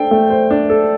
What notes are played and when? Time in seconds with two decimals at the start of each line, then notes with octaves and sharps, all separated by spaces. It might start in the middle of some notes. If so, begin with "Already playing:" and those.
Already playing: A3 D4 A4 C5 G5
0.11 A3
0.30 C5
0.50 D4
0.70 A4